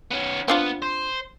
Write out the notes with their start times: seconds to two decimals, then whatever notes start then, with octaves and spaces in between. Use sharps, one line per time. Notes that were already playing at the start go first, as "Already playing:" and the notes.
0.11 B3 C#4
0.48 B3 C4 D4 F4
0.82 C5